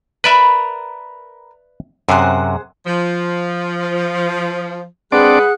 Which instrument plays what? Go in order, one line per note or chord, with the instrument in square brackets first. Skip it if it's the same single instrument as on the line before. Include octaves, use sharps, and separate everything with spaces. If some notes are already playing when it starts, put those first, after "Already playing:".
[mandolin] A#4 B5 F6 [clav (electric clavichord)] B4 D5 E5
[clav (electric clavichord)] F#2 C3 [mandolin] G#4 C5 F#5
[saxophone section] F3
[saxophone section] G#3 B4 [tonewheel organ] C4 D4 D5 [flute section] G#4 F#5 F#6